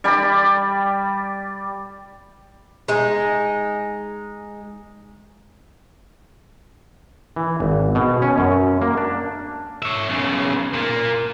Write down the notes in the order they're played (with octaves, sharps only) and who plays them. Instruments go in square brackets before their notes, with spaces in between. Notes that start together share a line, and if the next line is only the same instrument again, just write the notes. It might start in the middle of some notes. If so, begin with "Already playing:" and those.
[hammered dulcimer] G3 D5 B5
[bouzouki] G#3 D#4
[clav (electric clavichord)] E3
G#1
B2
C#4
F#2
A#3
D4
[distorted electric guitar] C#5 E5
B1 C#3
A#2 A#3